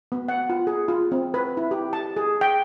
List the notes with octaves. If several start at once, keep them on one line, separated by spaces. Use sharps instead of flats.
B3
F#5
F4
G#4
F4
C4
B4
E4
G4
A5
G#4
G5